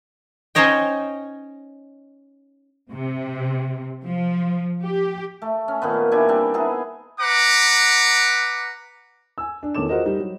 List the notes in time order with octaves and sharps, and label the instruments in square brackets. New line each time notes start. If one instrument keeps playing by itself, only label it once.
[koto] C#4 D#4 C5 C#5 D#5 G5
[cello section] C3
F3
G4
[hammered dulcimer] A3
C#4
A#2 D#3 B3
D4 E4 G4 G#5
G3 C4 D4
B3 D#4 E4 G#4
[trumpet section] B4 F#5 A#5 D6
[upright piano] G#5 E6
D4
E2 D#3 C#4 A4 D6 E7
F4 F#4 G#4 A#4 C5 D#5
G3 D#4
F#3